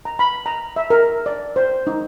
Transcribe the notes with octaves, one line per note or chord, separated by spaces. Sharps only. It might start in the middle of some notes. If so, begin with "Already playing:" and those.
A#5
B5
A#5
E5
A#4
D5
C5
D#4